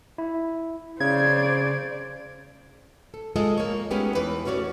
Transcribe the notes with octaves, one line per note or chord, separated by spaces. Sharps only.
E4
C#3 C5 D5 G#6
A4
G#3 F4 A4 D#5
A#3 C#5
G#3 A3 B3 C#4 D#4 G4
E2 E3 B4
A3 C#4 F#4 C#5 D5